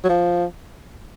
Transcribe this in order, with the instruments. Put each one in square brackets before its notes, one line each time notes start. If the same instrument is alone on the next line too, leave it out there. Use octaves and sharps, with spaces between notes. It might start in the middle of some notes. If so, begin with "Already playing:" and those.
[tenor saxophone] F#3
F3